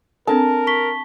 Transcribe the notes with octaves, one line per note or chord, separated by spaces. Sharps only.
C4 D4 A4 A#4 A5
C#6 B6 G7